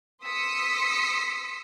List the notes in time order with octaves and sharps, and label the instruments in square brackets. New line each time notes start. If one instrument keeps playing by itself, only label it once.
[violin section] C6 D#6 E6 B6 C#7